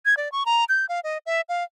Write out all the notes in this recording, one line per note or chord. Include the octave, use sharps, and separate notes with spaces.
G#6
D5
C#6
A#5
G6
F5
D#5
E5
F5